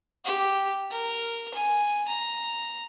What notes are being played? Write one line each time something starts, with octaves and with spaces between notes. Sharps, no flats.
G4
A#4
G#5
A#5